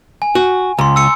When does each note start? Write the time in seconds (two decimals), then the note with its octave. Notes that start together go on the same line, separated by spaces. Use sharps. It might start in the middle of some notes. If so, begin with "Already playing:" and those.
0.22 G#5
0.35 F#4
0.79 C#2 A#5 C6
0.96 E6 C#7